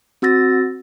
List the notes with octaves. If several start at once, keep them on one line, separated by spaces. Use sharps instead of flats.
C4 F#4 E6 A6 A#6